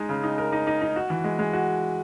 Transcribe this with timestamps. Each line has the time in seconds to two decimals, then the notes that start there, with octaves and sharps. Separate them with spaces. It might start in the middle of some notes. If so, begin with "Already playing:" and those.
Already playing: G#3 D#4
0.09 C#3
0.24 D#4
0.38 A#4
0.52 D#4
0.67 D#4
0.82 D#4
0.96 F#4
1.10 E3
1.24 G#3
1.39 G#3
1.53 F#4